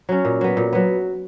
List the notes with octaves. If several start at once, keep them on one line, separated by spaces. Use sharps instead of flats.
F#3 C#4
A#2
F#3 B3
A#2
F#3 B3